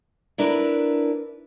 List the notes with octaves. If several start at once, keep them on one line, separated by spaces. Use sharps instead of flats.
D4 E4 A#4 B4